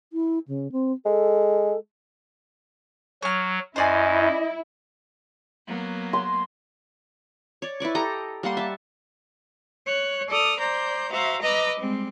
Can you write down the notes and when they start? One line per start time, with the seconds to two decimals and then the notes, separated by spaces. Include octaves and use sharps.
0.13 E4
0.48 C#3
0.72 C4
1.06 G#3 A4
3.22 F#3 C#5 F6
3.76 F#2 E4 C5 D5 D#5 G#5
5.67 F#3 A#3 B3
6.13 C6
7.62 C#5 D5
7.80 E4 B4 D5 C#6
7.95 G4 A4 D#5 A#5
8.43 G3 A#3 F#5 C6
8.57 E5 A5
9.86 C#5 F#6
10.28 A4 D5 D#6 F6
10.59 C5 D5 A#5 G6
11.11 F#4 C5 E5 F5 A#5
11.41 B4 D#5 A#5 B5 D6 E6
11.78 G3 G#3 C4